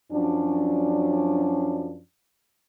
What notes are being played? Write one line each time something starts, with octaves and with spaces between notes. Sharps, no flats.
F#2 F3 F#3 C#4 D4